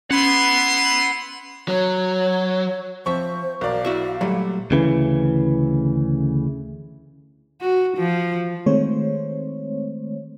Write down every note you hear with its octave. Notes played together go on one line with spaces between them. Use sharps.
C#4 E4 B4 F#5 B5 C6
F#3 C#5
F3 C4 C5 E5 C#6
B1 A#4 D5 F5
E4 F#4 E5
A#2 F#3 G3 A3
D2 C#3 E3
F#4
F3
D#3 G#3 A3 C4 C5 C#5